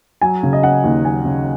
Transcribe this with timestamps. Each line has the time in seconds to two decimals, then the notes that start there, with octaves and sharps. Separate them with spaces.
0.22 F#3 G#5
0.43 C#3
0.53 D#5
0.63 C#4 F#5
0.84 D#2
1.04 F#3 G#5
1.25 C#3